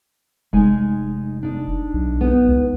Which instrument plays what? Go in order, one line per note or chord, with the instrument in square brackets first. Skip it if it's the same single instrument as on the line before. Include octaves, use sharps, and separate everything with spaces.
[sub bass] F1 [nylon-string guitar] G#3 D#4 G#5
[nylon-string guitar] D4 D#4
[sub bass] B1
[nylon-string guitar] B3 D#4
[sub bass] C#2